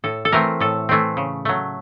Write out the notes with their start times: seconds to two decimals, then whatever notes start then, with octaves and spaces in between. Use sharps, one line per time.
0.04 A2 A4
0.25 A4
0.32 E3 A3 C4 A#4
0.60 A2 A4
0.89 E3 A3 C4
1.17 C#3
1.45 F#3 A3